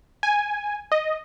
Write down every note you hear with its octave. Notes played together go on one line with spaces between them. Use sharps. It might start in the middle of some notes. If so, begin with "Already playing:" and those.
G#5
D#5